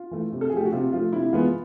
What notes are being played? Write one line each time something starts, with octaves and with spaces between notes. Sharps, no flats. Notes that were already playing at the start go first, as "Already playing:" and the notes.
Already playing: F4
E3 A3
C3
A4
G#4
F3 A3 G4
F#4
C3 F4
F3 A3 F4
C3 E4
E3 G#3 B3 F4